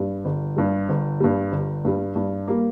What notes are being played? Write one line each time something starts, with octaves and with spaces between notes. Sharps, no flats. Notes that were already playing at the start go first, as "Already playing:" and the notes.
Already playing: G2 G3
G1
G2 G3
G1
G2 G3
G1
G2 G3
G2
G3 A#3